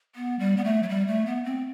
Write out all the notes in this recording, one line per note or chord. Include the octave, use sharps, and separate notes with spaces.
B3
G3
B3
A3
F#3
G3
A3
B3
C4